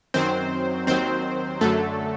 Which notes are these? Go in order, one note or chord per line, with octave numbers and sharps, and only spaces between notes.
F#2 D#3 F#3 C4 C5
D#2 D#3 F#3 C4 C5
F#2 D3 F#3 A3 A4